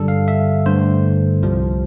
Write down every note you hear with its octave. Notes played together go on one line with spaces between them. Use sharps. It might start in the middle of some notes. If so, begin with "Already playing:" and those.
Already playing: G2 D3 G3 A4
F5
E5
G2 D3 A3 C5
C2 C3 F3